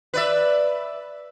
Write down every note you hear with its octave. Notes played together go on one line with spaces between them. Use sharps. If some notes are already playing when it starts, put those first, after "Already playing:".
B4 D5 E5